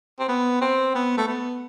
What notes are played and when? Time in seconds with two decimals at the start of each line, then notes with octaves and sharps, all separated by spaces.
0.20 C4
0.28 B3
0.61 C4
0.95 B3
1.17 A3
1.28 B3